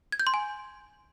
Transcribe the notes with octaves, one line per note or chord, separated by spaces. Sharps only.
G#6
G6
C6
G#5